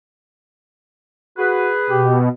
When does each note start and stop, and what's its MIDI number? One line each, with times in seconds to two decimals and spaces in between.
1.38 1.70 66
1.38 2.05 68
1.38 2.05 71
1.90 2.28 47
1.90 2.16 67